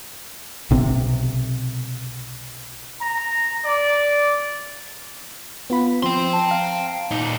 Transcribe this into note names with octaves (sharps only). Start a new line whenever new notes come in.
B1 C3 C4
A#5
D5
B3 F4 B5
F3 C4 G5 C6
A5
F5 A#5
A#2 D#4